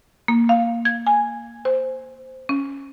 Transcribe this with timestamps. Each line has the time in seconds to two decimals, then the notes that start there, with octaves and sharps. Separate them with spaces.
0.28 A#3
0.49 F5
0.85 G#6
1.07 G#5
1.65 C5
2.49 C#4